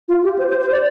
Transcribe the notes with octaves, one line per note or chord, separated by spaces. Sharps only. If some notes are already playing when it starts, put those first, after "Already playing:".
F4
G4
C5
C5
C5
D5